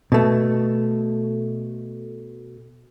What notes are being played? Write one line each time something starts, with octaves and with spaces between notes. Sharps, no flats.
B2 A3